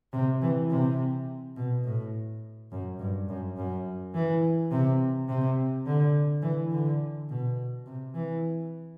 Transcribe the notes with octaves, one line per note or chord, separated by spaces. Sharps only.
C3
E3
C3
B2
A2
F#2
G2
F#2
F#2
E3
C3
C3
D3
E3
D3
B2
C3
E3